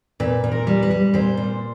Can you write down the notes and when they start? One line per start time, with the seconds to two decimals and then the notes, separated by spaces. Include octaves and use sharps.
0.20 A#2 B4
0.44 A#2
0.52 A#4
0.67 G3
0.83 B4
0.91 G3
1.14 A#2 C5
1.37 A#2